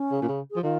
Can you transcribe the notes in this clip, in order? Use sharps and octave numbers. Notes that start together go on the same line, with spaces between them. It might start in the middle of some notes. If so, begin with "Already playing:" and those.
Already playing: C#4
C#3
A#2
C#3
F3 G#4
D#3 F4